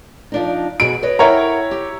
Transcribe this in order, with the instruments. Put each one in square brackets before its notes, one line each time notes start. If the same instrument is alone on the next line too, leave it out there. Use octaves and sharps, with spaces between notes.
[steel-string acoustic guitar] F3 D4 D#4
[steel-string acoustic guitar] B2 F#4 G#4 [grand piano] D7
[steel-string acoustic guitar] B4 C#5 D#5
[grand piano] E4 C#5 A#5 [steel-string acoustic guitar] A#4 F#5 G5
[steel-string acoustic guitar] G4